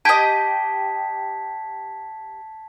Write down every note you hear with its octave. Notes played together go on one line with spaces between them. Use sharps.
G4 D#5 A5 G#6 B6